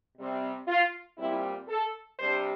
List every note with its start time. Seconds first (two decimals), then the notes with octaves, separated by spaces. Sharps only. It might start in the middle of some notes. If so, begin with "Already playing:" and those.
0.18 C3 G3 C4
0.67 F4
1.18 A#2 G3 C4 E4
1.69 A4
2.18 C3 G3 D4 C5